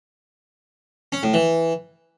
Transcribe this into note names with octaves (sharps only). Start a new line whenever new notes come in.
C#4
A2
E3